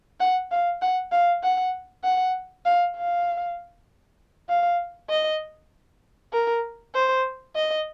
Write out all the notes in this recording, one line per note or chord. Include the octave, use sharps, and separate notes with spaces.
F#5
F5
F#5
F5
F#5
F#5
F5
F5
F5
D#5
A#4
C5
D#5